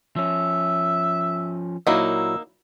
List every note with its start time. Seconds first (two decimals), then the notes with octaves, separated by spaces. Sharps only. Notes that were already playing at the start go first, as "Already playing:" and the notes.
0.16 F3 C#4 E5
1.87 A#2 F#3 A#3 D#4 E4 E6